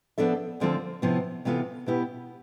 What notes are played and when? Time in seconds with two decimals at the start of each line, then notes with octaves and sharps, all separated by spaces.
0.18 F3 B3 D4 A4 E5
0.60 D2 D3 F3 C4 F4
1.02 C3 F3 B3 E4
1.45 C3 E3 B3 F4 A4
1.86 B2 B3 E4 G4 B4